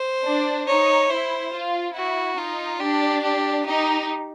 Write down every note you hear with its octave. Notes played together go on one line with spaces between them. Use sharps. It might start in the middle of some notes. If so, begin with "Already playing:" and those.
Already playing: C5
D4
D#4 C#5
E4 C5
F4
E4 F#4
D#4 F4
D4 G4
G4
D#4 G4